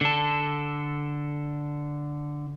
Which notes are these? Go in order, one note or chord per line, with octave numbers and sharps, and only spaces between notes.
D3 A4